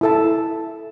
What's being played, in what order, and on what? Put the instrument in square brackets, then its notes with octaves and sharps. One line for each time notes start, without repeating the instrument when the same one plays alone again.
[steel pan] E4 A4 E5 A5